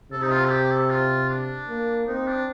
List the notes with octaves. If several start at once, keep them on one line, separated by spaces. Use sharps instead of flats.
C3 A4
D#4
F4
A4
G4
A4
F4
D4
A#3
C4 D#4
D4